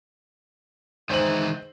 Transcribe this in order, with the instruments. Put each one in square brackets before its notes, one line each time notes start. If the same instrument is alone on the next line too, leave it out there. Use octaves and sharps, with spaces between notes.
[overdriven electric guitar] D#3 E3 [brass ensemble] G#3 D#4 [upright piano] C5 F#7